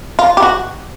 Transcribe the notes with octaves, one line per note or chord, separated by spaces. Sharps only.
F4
G4
F#4